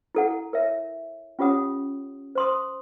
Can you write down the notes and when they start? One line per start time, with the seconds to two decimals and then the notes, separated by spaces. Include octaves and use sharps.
0.15 E4 A4 F#5
0.53 A#4 C#5 E5
1.39 C#4 F4 G4 C#5 F#5 D#6
2.35 C5 C6 D#6